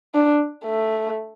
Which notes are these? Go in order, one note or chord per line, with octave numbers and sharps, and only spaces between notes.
D4
A3